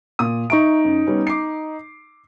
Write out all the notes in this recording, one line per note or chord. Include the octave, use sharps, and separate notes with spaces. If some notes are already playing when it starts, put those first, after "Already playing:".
A#2 D#6
D#4 E5 A#5 C#6 D7
F#2
G3 B3 C#4
D6 C7